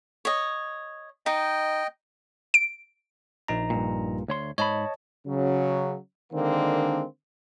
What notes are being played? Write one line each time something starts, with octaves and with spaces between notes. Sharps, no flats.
C#5 D#5
D#4 D#5 G5
D7
A#1 D#4 A#5
G2 A#2
D2 C#5 C6
G#2 C#5 D#5 A5 B5
C#3 F#3
D3 D#3 G#3 A#3 C4 D4